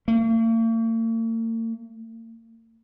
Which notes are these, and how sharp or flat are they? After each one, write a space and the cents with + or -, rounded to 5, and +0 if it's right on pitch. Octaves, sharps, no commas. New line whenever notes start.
A#3 -45